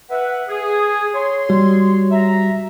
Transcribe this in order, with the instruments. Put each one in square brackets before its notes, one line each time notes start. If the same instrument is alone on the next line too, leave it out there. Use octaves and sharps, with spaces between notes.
[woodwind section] B4 E5 F#5
G#4
C#5 C6
[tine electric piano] G3 F#4
[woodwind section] E5 A#5